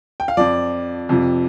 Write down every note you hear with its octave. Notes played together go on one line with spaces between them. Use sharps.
G5
F5
F2 F3 D5
F2 C3 F3